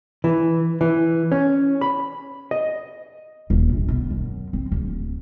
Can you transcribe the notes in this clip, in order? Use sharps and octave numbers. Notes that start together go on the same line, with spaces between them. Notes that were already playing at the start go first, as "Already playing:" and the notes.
E3
E3
C#4
B5
D#5
D#1
A#1
B2
F#2
C4
D1